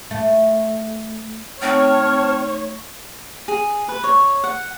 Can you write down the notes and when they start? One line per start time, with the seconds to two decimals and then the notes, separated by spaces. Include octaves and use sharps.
0.11 A3
1.62 A3 C4 D#4 C#5 A5 C#6 F6
3.48 G#4
3.89 B4
4.04 C#5
4.44 F#5